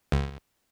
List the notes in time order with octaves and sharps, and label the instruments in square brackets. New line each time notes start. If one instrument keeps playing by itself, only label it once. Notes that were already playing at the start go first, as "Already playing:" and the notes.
[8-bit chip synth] C#2